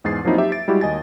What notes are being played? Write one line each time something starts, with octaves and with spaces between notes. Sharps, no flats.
E2 G#2 G#4 A6 C7
F3 F#3 A#3 C4 D#4 E4
G4 E5
A6 D7
G3 G#3 E4 F#4 G4
D#2 D#5 G#5 A6